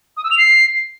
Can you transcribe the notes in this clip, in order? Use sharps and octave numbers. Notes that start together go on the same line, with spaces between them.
D#6
E6
F7
C7